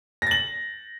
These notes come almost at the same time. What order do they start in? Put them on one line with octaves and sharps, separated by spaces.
A#6 A6 F#7